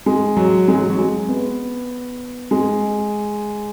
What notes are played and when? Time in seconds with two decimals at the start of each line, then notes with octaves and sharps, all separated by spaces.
0.06 G#3
0.37 F#3
0.68 G#3
0.75 F#3
0.90 F#3
0.99 G#3
1.28 B3
2.51 G#3